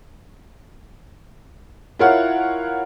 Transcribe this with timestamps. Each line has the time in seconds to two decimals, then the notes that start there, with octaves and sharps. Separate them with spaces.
1.99 E4 F4 A#4 C#5 F5 F#5